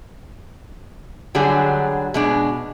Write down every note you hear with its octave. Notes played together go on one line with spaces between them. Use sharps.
D3 F#3 G3 D4 G#4
B2 G#3 D4